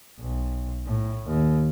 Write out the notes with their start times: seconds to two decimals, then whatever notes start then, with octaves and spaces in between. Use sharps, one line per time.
0.20 B1
0.87 A2
1.26 D#2